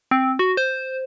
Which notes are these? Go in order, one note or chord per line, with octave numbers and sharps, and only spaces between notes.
C4
F#4
C5